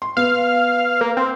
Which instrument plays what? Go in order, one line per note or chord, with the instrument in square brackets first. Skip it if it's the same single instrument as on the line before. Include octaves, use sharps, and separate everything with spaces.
[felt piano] C6
[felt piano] B3 [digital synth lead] F5
[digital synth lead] A#3
C4